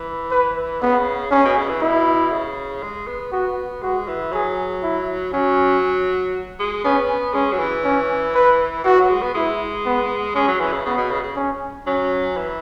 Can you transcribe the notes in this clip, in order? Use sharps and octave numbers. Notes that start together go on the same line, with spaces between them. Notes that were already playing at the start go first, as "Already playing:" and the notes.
Already playing: E3
B4
C#3 B3
C#3 C#4
B2
C#3
E3
B2 E4
C#3
G#3
B3
B3 F#4
G#3 F#4
E3
F#3 G#4
E4
F#3 C#4
G#3
B3 C#4
G#3 C#4
F#3
E3
C#4
B4
E3 F#4
F#3
G#3
B3
G#3 E4
B3
G#3 C#4
F#3
E3
C#3
C#3 B3
B2
C#3
C#3
C#4
F#3 C#4
E3